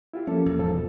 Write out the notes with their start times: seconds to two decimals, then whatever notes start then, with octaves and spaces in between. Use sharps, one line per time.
0.13 E4 F4 G4
0.27 F3 A#3 C#4 A4
0.46 E1 E2
0.59 G#2 F3 A4
0.74 B2